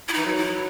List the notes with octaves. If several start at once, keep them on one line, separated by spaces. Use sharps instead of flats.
E4
E3 D#4
F#3
E4